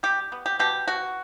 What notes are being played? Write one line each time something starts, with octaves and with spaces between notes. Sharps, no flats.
G3 G4
B3
G4
B2 G4
B2 F#4